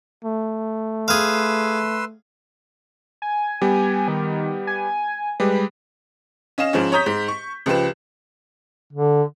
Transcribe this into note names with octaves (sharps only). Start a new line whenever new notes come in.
A3
G#4 B4 F5 C6 E6
G#5
G3 B3 G4
D#3
G#5
G3 G#3 G4 B4
C#4 D#5 F5 E7
G#2 F3 C#4
C#5 A#5 D#6 G6 B6
G#2
C#6
C#2 F3 G4 B4 E7
D3